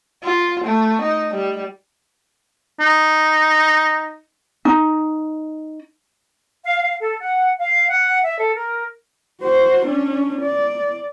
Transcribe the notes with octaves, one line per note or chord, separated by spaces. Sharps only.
F4
A3
D#4
G3
D#4
D#4
F5
F5
A4
F#5
F5
F#5
E5
A4
A#4
F#4 C5
C#4 D4
D5